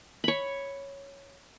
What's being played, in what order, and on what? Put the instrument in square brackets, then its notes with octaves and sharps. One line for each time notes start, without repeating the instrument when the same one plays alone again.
[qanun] C#5 B5